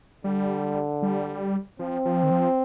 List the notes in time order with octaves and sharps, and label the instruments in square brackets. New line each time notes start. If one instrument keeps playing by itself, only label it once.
[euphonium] D3 [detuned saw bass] G3
[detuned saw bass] G3
[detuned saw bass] F3 [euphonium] C4
[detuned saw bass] F3
D#3
F3